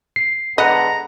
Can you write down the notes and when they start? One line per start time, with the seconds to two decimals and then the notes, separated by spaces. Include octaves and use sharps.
0.16 C7
0.58 D3 G#3 B3 D#5 F#5 A#5 B5